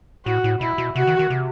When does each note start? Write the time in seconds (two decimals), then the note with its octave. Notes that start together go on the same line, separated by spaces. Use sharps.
0.26 A2 F#4
0.44 A2
0.61 B2 E4
0.78 B2
0.95 C3 F#4
1.07 D#3
1.19 D#3
1.30 C3